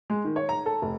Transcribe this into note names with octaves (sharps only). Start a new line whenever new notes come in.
G#3
D#3
C#5
A#5
A4
F1